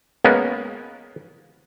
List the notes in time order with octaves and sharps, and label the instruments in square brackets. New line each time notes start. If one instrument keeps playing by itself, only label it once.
[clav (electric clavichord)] G#3 A#3 B3 C#4